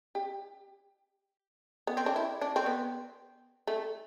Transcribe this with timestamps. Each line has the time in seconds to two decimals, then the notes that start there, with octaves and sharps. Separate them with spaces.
0.15 G4
1.87 B3
1.97 C4
2.06 D4
2.16 E4
2.41 D4
2.56 C4
2.66 B3
3.67 A3